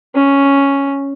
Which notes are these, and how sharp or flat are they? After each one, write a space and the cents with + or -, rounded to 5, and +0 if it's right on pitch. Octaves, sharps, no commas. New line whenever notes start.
C#4 +0